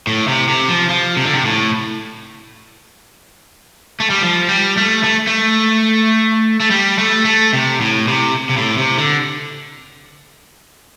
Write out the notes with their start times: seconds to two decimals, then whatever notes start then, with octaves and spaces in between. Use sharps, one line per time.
0.07 A2
0.28 C3
0.48 C3
0.68 F3
0.90 F3
1.17 C3
1.25 D3
1.34 C3
1.45 A2
4.00 A3
4.10 G3
4.22 F3
4.48 G3
4.77 A3
5.04 A3
5.27 A3
6.60 A3
6.71 G3
6.98 A3
7.25 A3
7.53 C3
7.81 A2
8.08 C3
8.49 C3
8.57 A2
8.78 C3
8.98 D3